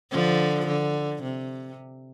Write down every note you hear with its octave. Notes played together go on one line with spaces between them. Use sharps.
D3 F3
D3
C3